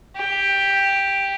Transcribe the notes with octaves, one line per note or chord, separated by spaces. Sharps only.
G4